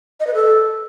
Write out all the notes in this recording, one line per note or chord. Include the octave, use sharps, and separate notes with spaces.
D#5
B4
A4